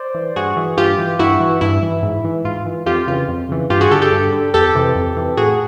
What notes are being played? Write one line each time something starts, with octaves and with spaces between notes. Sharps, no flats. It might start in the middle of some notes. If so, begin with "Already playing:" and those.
Already playing: C5 D5
E3
G2 F#4 G#4
E3
G2 F4 G4
E3
G2 E4 F#4
E3
G2 E4
E3
G#2
E3
G#2 F4
E3
F2 F4 G4
C#3 E3 F4
F2
C#3 E3
G2 F4 G4
F#4 G#4
D3 G4 A4
G4 A4
G2
D3
F2 G4 A4
C3 E3
F2
C3 E3
A2 F#4 G#4